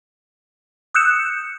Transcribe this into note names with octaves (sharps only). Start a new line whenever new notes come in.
D#6 E6 F#6 G6 C#7 E7